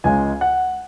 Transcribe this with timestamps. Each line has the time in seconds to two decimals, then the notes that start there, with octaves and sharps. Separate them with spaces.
0.04 C#2 C#3 G#3 G#5
0.41 F#5